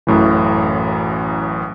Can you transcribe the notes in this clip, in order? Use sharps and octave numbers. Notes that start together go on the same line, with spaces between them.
A1 F#2 A2 E3